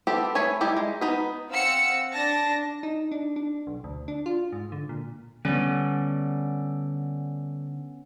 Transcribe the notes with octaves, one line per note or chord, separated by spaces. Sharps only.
B3 C4 G4 A4
A3 G#4 B4 C#5 G#5
G3 D#4 E4 G4
G#3
B3 D#4 B4
C4 F5 F#5 E6 C#7
D4 A5 A#6
D#4
D4
D4
B1
D2
D4
F4
G#2
D3
A#2
D3 G3 B3 C#4